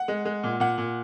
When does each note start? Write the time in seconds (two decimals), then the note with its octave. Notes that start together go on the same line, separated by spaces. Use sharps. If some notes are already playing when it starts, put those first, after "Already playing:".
Already playing: F#5
0.08 G#3
0.25 G#3
0.43 A#2
0.60 A#2 F#5
0.78 A#2